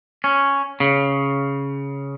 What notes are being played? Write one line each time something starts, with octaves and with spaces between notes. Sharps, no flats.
C#4
C#3